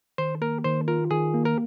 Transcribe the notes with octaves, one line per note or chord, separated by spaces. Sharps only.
D#3 C5
A#3 A#4
D#3 C5
F4 A#4
D#3 G#4
A#3
A#4